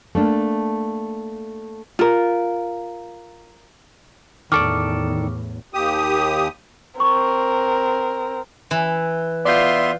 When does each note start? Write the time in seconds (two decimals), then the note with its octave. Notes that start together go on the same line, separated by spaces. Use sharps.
0.15 A3 A#3 D4
1.99 F4 A#4
4.52 E2 A2 D#3 A4 D5 C#6 D6 F6
5.74 D#2 G4 D#6
7.00 C4 A#4 C#6
8.71 E3
9.45 B3 F4 D5 E5 C6 G6